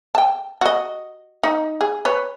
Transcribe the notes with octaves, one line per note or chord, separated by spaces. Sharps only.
G5 A5
F#4 D#5
D#4
G#4
B4 C#5